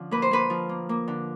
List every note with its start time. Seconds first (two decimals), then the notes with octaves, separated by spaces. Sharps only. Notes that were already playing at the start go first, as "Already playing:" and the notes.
Already playing: D3 F3 C#4
0.11 A#3 B4
0.22 C5
0.31 A#3 B4
0.50 F3
0.69 A#3
0.89 A#3
1.08 D3